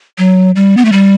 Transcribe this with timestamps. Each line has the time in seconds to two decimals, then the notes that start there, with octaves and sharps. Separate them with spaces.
0.18 F#3
0.56 G3
0.77 B3
0.85 A3
0.92 G3